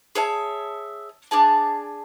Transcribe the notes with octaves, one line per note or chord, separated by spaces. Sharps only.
G#4 C#5 E5 A5
D4 G#4 D5 A5